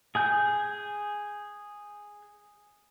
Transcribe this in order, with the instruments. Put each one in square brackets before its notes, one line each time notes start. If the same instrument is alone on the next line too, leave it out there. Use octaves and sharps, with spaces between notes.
[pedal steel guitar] G#4 G#5 G6